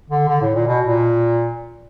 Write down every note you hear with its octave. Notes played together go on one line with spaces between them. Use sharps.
D3
D3
A2
A#2
B2
A#2